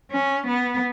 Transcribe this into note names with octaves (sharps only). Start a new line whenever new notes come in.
C#4
B3